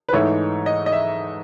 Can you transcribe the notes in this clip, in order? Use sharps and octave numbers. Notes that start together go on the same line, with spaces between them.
B4
G#2 E3 A3 D#4 C#5
D#5
D#5
E5